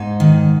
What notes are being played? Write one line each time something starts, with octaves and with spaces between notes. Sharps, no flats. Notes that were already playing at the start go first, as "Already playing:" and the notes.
Already playing: G#2 D#4
D#3